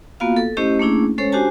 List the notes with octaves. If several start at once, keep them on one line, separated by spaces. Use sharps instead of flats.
A#3 B3 F4 F#4 F5
A4
A3 C#4 E4 G4 C5 D#5
A3 A#3 C#4 D4 E4 G#4
G#3 C#4 A4 C5 C#5
D4 F#4 G4 C5 G#5 A5